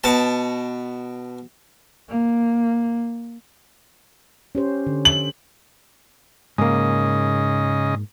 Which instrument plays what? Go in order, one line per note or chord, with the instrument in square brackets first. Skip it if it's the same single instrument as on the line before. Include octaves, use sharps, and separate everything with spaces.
[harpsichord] B2 A5
[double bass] A#3
[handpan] C#4 G4 C5
D3
[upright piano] F#7
[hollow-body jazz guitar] G#2 A#3 [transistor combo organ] C#3 D#5